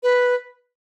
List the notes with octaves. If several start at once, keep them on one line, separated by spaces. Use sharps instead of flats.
B4